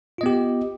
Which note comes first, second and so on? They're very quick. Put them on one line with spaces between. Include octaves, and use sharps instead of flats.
F4 D#5 B3 G4